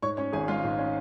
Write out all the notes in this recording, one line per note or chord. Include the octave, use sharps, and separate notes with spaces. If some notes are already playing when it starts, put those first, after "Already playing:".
G#2 C#5 C#6
C#4 C#5 C#6
G#1 G#4 G#5
G#3 F4 F5
G#2
C#4